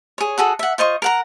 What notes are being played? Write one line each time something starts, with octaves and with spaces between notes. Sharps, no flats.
G#4 C#5
F#4 G#4 A4 F#5
E5 F#5
F4 C5 D#5 C#6
A#4 F#5 A#5